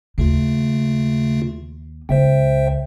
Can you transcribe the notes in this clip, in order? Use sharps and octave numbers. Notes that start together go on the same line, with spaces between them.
D#2 C#3 A3 F4
C#2 C5 E5 G5